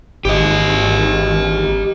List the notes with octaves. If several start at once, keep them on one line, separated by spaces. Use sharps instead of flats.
G#1 G4 D#5